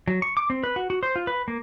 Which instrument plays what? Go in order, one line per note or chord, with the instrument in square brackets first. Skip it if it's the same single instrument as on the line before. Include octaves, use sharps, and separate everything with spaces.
[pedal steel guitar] F#3
C#6
D6
C4
B4
F#4
F#4
C5
F4
B4
A#3